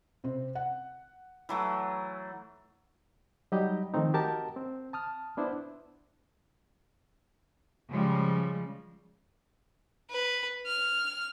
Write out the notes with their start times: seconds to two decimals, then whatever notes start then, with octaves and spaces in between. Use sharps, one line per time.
0.24 C3 C4
0.55 F#5
1.49 E3 F#3 A3
3.52 F#3 G3 D#4 G4 D#5
3.94 D#3 F3 A3 C4 D#4
4.14 F#4 G4 A#4 D#5 A5
4.56 C4
4.93 A5 D#6 F6
5.37 B3 D4 E4 C5
7.90 C#3 F3 G3 G#3
10.10 B4
10.66 F6